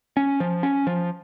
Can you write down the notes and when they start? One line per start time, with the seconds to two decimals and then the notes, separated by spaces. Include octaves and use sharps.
0.17 C#4
0.40 F3
0.63 C#4
0.87 F3